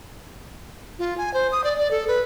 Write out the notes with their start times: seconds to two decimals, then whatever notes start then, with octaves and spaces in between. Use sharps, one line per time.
0.99 F4
1.18 G#5
1.34 C5
1.52 D#6
1.64 D5
1.78 D5
1.91 A4
2.08 B4